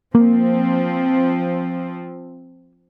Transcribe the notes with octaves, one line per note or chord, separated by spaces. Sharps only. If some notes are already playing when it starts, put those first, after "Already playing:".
F3 A#3 C4